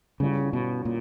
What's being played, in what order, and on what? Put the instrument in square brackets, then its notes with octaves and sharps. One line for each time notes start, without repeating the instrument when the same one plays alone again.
[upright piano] G1 G2 G3 C#4 E4 [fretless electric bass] C#3
[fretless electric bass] B2
A#2